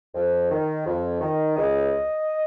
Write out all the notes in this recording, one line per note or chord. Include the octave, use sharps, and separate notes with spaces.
F2
D#3
F2
D#3
C#2 D#5